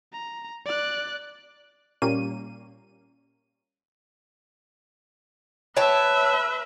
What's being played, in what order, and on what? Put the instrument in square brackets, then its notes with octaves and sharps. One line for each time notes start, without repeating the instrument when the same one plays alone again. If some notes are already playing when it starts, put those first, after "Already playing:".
[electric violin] A#5
D5 F#6
[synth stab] A#2 G3 A#3 C#4 D#7
[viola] B4 E5 [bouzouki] C#5 G5 A5